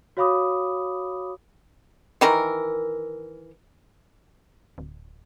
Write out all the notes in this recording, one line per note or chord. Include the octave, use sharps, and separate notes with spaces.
F#4 C#5 F5 B5 D6 D#6
D#3 E3 A#4
D1